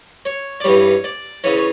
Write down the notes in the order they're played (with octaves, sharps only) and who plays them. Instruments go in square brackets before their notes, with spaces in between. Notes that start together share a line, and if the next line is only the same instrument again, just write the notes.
[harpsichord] C#5
D5
G2 E3 G3 C#5
D5
C#3 E3 C#5
C#5